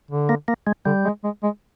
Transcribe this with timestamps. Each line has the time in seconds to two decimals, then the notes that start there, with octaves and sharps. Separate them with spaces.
0.11 D3
0.29 A#3
0.48 A#3
0.67 G#3
0.86 D3 G3
1.05 G#3
1.24 G#3
1.43 G#3